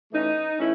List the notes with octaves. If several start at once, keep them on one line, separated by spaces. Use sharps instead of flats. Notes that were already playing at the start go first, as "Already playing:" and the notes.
E3 A3 C#4 D#4
E3 A3 C#4 E4